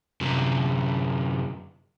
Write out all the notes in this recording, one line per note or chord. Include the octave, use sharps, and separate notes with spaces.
F#2 C3